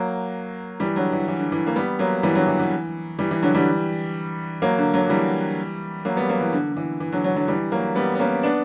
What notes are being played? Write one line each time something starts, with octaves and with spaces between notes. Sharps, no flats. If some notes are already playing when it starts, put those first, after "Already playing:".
Already playing: F#3 A#3
E3 G3
D3 F#3
E3
E3
D3
E3
A#3
G3 B3
F#3 A#3
E3 G3
D3 F#3
E3
E3
E3 G3
E3
D3 F#3
E3 G3
F#3 A#3
D3
D3 F#3
E3 G3
F#3 A#3
G3 B3
F#3 A#3
E3
D3
D3
E3
E3
D3 F#3
D3 F#3
D3 F#3
E3 G3
F#3 A#3
G3 B3
B3
A#3 C#4
B3 D4